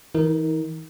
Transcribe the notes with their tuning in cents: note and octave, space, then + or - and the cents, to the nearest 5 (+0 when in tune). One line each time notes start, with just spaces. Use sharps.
E3 -30 D#4 +40 A#4 +0